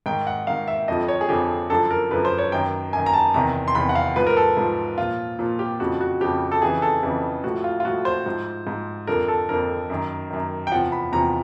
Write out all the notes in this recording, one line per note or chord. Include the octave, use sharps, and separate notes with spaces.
G#2 D#3 G5
F#5
G#2 D#3 F5
E5
F2 D3 F3 D#5
C#5
G#4
F2 D3 F3 G4
F#2 D3 F3 A4
A#4
F#2 D3 F3 B4
C5
C#5
F#2 D#3 G5
F#2 D#3 G#5
A#5
A5
E2 C3 D#3 A#5
C6
E2 C3 D#3 B5
F#5
F5
G#2 F3 B4
A#4
A4
G#2 F3
A#2 F3 F4
A#2 F3
G4
F2 C#3 F3 F#4
F#4
F2 C#3 F3 G4
A4
F2 C#3 E3 G#4
A4
F2 C#3 E3
A2 F3 F#4
F4
F4
A2 F3 F#4
C5
G#2 F3
G#2 F3
F2 D3 F3 A#4
A4
F2 D3 F3 A#4
F#2 D#3
F#2 D#3
G5
E2 C3 F3 F#5
B5
E2 C3 F3 A#5